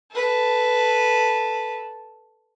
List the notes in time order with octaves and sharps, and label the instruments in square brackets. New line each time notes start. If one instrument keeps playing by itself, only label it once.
[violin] A4 B4